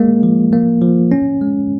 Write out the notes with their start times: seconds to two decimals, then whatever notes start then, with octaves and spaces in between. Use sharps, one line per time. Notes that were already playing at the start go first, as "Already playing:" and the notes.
Already playing: G#3 A#3
0.23 F3
0.53 A#3
0.82 F3
1.12 C#4
1.41 G#3